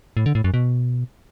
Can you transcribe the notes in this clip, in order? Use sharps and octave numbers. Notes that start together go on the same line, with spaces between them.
A2
D3
A2
F#2
B2